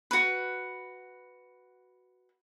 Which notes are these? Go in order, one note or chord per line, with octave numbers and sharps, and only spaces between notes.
F#4 B4